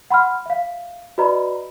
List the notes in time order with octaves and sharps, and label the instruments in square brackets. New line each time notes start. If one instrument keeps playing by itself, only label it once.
[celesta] F#5 B5 C6 F6
E5 F5
F#4 B4 D5 D#5 A#5 B5